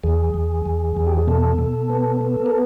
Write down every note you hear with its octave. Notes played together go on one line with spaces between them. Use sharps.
E2 G#4
E2
E2
E2
G4
G#4
B2 A4
B2
B3
B3
A#4